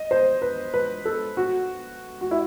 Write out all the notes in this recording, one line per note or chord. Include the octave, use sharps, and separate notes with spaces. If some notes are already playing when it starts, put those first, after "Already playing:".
Already playing: D#5
C5
B4
B4
A4
F#4
F#4
E4